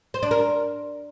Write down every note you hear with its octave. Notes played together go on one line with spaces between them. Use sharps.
C5
D4
A#4